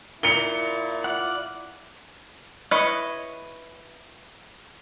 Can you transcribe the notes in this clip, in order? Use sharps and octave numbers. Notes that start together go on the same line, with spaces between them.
A#2 E4 C#7 F7 G7
F4 D5 F#5
E4 B4 C#5 D#5